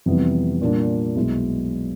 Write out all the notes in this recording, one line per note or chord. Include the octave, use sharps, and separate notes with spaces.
F2 C3 E3 G3 B3
A#2 G3 A#3 D4
B1 B2 G#3 B3 E4